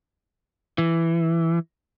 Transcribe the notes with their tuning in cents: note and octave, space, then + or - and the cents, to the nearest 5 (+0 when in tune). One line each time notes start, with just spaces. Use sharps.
E3 +10